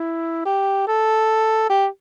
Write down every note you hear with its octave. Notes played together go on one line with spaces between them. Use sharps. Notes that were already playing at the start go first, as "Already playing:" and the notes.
Already playing: E4
G4
A4
G4